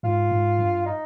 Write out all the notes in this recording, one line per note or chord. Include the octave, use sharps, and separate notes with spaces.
G#2 F4
G#2
G2
D#4